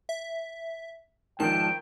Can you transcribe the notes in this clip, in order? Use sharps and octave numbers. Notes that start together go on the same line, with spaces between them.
E5
G#2 D#3 F3 G5 A5